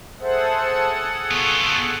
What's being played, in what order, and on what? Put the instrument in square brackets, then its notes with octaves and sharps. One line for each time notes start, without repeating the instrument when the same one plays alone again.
[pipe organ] G#4 A4 F#5 [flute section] C5 E5 A5
[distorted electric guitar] B3 F4 [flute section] C#6